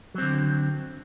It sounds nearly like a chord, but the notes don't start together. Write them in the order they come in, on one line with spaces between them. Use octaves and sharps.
F#3 C4 D3